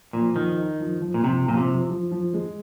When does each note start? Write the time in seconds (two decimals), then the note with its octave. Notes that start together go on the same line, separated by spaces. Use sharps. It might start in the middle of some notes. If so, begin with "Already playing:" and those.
0.13 A#2 F3
0.35 D#3 F3
0.57 D#4
0.80 F3
1.01 F3
1.14 A#2
1.23 C3 F3
1.46 A#2 F3
1.57 C3
1.68 F3
1.90 F3
2.11 F3
2.34 G#3